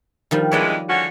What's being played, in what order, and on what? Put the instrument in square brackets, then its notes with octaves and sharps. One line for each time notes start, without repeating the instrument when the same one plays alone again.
[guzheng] D#3 F3 G3
[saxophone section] F2 E3 G#3 [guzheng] C#5 D5 G5
[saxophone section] D3 C#4 F#4